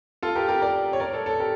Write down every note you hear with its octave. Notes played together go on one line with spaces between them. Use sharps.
F4 A4
G4 A#4
G4 A#4
A#4 D5
C#5
A#4 D5
A4 C#5
A4 C#5
G4 A#4